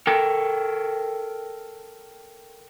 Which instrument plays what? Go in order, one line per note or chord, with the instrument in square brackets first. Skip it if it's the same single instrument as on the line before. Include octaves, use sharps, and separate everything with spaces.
[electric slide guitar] A4 A#4 G5